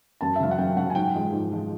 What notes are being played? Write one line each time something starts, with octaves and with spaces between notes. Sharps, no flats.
F#2 A5
E5
C#3 F#3 F5
F#5
F#2 G5
C#3 F#3 F#5
G#5
G#2 G5
F3 G#3
G#2
F3 G#3